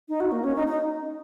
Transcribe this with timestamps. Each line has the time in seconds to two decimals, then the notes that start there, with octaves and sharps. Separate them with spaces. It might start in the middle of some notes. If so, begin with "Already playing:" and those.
0.09 D#4
0.20 F#4
0.32 A#3
0.44 C#4
0.56 D#4
0.68 D#4